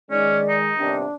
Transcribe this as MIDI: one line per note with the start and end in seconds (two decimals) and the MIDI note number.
0.10 0.71 51
0.10 0.71 56
0.10 0.38 61
0.10 0.56 74
0.48 0.92 63
0.77 1.04 31
0.77 1.04 39
0.77 1.04 48
0.77 1.15 62